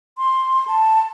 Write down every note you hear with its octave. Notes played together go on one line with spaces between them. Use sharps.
C6
A5